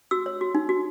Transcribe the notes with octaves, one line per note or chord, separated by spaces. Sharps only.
F#4 E6
C#5
F#4
D#4
F#4